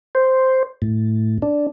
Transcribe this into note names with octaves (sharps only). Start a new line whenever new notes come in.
C5
A2
D4